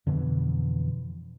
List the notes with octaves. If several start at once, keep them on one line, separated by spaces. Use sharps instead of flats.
F2 B2 D3 E3